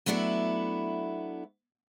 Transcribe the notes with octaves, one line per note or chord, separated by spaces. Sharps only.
F#3 A3 B3 D4 E4